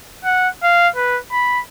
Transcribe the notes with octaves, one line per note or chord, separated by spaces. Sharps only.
F#5
F5
B4
B5